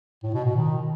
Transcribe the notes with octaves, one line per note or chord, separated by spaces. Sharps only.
A2
B2
B2
D#3